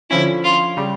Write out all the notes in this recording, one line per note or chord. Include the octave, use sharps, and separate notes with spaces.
D3 F3 C#4 E4
F4
C#3 G3